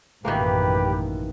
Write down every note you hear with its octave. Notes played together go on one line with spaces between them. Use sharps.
A1 F#2 B2 D#3 E3 A#3 G4 B4